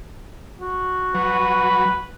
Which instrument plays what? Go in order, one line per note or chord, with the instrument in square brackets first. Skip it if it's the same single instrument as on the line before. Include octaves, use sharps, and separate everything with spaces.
[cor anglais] F#4
[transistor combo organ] F#3 [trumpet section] B4